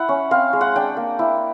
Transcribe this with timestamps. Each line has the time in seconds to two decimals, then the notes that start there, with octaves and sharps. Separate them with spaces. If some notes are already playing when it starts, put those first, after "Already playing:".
Already playing: E4 F#5
0.09 C#4
0.31 C4 F5
0.53 G#3
0.61 F#5
0.76 D4 G5
0.97 A#3
1.19 E4